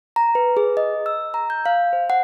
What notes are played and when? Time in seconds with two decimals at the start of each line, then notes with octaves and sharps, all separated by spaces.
0.16 A#5
0.35 B4
0.57 G#4
0.77 D#5
1.06 E6
1.34 A#5
1.50 G6
1.66 F5
1.93 C5
2.10 F#5